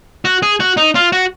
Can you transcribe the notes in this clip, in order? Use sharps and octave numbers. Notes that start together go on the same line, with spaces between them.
F#4
G#4
F#4
D#4
F4
F#4